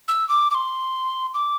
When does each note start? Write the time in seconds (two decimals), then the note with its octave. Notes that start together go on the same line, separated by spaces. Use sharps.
0.08 E6
0.29 D6
0.51 D6
0.55 C6
1.34 D6